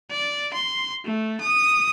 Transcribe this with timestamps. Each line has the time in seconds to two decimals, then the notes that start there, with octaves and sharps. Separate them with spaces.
0.11 D5
0.53 C6
1.05 A3
1.41 D#6